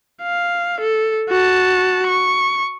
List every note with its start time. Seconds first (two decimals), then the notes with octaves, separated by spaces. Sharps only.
0.23 F5
0.81 A4
1.29 F#4 A5
2.07 C#6